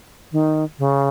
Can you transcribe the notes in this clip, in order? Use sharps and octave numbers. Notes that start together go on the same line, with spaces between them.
D#3
C#3